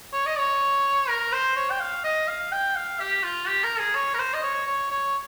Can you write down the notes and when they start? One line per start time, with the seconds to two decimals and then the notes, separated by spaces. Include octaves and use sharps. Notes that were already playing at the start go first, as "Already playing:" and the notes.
0.13 C#5
0.26 D#5
0.38 C#5
1.09 A#4
1.32 C5
1.56 C#5
1.71 G5
1.80 F5
2.04 D#5
2.28 F5
2.52 G5
2.75 F5
3.00 G4
3.23 F4
3.47 G4
3.64 A#4
3.79 G#4
3.95 C#5
4.14 A#4
4.19 C5
4.34 D#5
4.43 C#5
4.67 C#5
4.91 C#5